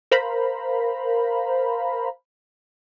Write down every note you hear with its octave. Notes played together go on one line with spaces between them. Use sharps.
A#4 C5 F5 A#5 B5